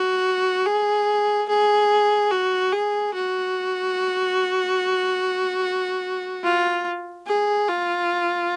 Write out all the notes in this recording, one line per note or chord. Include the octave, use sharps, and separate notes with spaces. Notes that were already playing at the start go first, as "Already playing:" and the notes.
Already playing: F#4
G#4
G#4
F#4
G#4
F#4
F4
G#4
F4